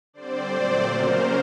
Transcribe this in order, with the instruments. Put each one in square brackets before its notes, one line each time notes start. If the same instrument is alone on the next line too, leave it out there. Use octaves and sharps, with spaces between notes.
[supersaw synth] D3 G3 C4 C5 D5
A#2 F#3 A3 C4
C#3 F#3 A#3 C#4 A#4 C5